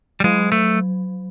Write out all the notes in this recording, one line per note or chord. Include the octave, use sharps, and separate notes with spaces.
G3
F#3 G#3
A3